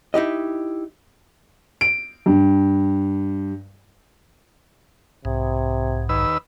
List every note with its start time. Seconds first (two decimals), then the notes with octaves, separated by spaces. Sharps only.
0.14 D#4 E4 G4 D#5
1.81 D7
2.26 G2
5.25 B1 G#2 C3
6.09 D#2 B4 E6